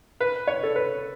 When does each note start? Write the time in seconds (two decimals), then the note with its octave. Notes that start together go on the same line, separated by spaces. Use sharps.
0.21 B4
0.47 C#5
0.63 A4
0.76 B4